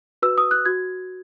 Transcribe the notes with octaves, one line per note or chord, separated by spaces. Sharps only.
F#4 B4 E6
D#6
F#6
F#4 G#6